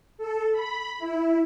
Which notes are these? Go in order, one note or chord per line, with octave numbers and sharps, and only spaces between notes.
A4
B5
E4